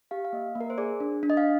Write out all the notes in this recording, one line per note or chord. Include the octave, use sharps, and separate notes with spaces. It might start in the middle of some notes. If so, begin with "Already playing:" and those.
G4 F5
F5
A#3 D#5
A#3
A#4
C5
G#4 D5
D4
D4
D#5
F5